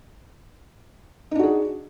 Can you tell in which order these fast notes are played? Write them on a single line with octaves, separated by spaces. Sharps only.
D#4 D4 F#4 G#4